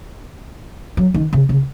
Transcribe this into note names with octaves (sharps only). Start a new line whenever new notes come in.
F#3
D#3
C#3
C#3